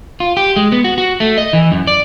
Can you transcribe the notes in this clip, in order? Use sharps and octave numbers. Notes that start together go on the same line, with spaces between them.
F4
G4
G#3
B3
F#4
F#4
A3
D#5
E3
F#2
D5